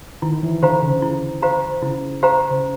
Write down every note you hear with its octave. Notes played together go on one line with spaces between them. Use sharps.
D#3 E4
E3
D3 G4 C5 F5 A#5
C#3
E4
G4 C5 F5 A#5
C#3 E4
G4 C5 F5 A#5
C#3